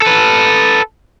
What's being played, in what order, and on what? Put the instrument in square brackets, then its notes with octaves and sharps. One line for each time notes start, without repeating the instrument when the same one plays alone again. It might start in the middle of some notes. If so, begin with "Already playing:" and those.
[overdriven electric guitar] A4 B4